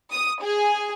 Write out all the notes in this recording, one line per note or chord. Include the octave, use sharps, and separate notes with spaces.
D#6
G#4